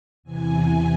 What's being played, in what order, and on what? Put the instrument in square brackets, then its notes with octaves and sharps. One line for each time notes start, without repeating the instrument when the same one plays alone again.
[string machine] E2 C3 E3 G#5